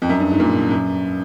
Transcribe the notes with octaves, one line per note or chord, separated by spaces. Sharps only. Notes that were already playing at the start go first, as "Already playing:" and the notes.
F2
F#2
G2
G#2
A#2
F#2